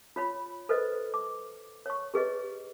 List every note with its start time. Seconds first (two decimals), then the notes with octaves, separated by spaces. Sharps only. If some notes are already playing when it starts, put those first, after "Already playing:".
0.16 F4 C#5 B5
0.69 A4 B4 C5 D#5
1.14 D6
1.86 C#5 C#6
2.14 G4 G#4 B4 D#5